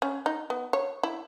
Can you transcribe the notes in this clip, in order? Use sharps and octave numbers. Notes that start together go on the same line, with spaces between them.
C#4
D#4
B3
C#5
E4